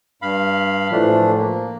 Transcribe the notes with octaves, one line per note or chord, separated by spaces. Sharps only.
G2 F5 B5
A2 E3 F3 A3 D4
A#3